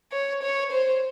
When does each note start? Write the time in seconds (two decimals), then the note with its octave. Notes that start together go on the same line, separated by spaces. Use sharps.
0.12 C#5
0.42 C#5
0.72 C5